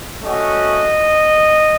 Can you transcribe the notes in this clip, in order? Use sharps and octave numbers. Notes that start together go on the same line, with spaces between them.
A3 C#4 F#4 D#5